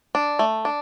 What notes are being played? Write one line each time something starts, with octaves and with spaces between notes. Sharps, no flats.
D4
A3
D4